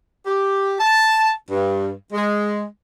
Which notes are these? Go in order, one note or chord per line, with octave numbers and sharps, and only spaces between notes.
G4
A5
G2
G#3